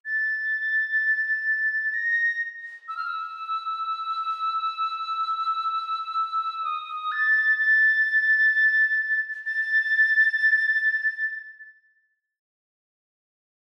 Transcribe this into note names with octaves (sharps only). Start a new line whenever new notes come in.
A6
A#6
E6
F6
E6
D#6
A6
A6
A6